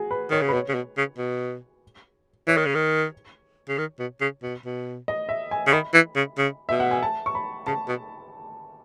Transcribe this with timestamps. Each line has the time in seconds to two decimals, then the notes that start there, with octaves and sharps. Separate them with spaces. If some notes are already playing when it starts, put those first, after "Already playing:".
Already playing: F#4 G#4
0.11 B4
0.30 D#3 C#5
0.42 C#3
0.48 B4
0.53 B2 C#5
0.69 C#3
0.75 B2
0.97 C#3
1.18 B2
2.48 E3 C#5
2.57 D#3
2.66 C#3
2.75 D#3
3.69 C#3
3.78 D#3
3.99 B2
4.21 C#3
4.43 B2
4.65 B2
5.08 D#5
5.29 E5
5.51 G#5
5.67 C#3
5.72 D#3 B5
5.94 E3
6.16 C#3
6.38 C#3
6.69 B2 E5
6.80 F#5
6.91 G#5
7.03 A5
7.26 C#6
7.35 B5
7.67 C#3 A5
7.88 B2